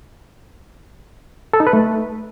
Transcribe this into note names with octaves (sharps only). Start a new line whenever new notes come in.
A4
D#4
B4
A3